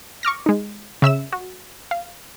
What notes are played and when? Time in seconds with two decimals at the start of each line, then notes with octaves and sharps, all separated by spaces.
0.23 C#6 D6 F6 A#6
0.46 G#3 D#4
1.02 C#3 E5 E6 E7
1.32 F#4
1.91 F5